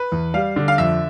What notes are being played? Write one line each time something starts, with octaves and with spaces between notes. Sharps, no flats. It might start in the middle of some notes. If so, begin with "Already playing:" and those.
Already playing: B4
E2
G3 F5
D3
F5
F2 E5